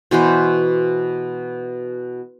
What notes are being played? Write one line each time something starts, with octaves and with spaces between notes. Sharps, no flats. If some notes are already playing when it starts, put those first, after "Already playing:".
B2 E3 F#4 C5